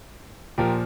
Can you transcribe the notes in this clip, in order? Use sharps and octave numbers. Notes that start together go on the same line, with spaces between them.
A#2 F3 G4 A#4